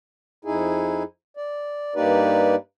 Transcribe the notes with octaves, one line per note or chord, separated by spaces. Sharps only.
F2 D#4 E4 G#4
D5
G2 A#3 D#4 G4 B4 D5